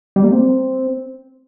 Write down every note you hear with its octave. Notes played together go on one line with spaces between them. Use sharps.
G3
A#3
C4